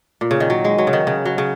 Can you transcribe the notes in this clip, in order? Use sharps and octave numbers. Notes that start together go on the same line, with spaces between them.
A#2
C#3
D#3
F#3
G#3
F#3
C#3
D#3
C#3
F#3
C#3